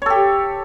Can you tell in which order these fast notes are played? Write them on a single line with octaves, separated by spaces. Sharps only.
C#5 A4 G4